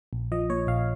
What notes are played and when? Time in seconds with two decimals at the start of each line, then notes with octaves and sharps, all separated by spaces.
0.13 A#1
0.32 F3 D#5
0.49 A#2 C#5
0.67 A#1 F5